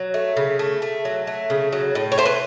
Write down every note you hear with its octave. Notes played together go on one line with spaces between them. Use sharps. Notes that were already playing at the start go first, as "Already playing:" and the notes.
Already playing: F#3
A3
C#3
A3
A3
F#3
A3
C#3
F#3
A2
C#5
A3 C5
B4